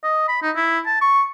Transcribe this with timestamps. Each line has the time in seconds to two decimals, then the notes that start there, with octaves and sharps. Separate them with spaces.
0.03 D#5
0.28 B5
0.42 D#4
0.56 E4
0.86 A5
1.01 C#6